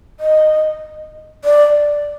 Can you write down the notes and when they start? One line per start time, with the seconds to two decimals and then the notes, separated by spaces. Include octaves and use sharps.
0.20 D#5
1.45 D5